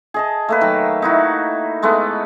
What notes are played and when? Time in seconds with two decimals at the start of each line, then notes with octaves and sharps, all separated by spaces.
0.14 G#4 D#5 A5
0.49 A3 A#3 B4
0.61 D#3 F#3
1.02 D#4 E4 F#4
1.82 G#3 A3 B3